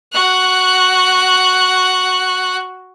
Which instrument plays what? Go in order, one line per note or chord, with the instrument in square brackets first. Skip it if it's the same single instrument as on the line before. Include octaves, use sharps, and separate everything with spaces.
[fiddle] F#4 F#6